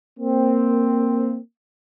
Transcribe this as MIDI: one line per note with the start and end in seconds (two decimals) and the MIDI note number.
0.20 1.39 58
0.20 1.39 60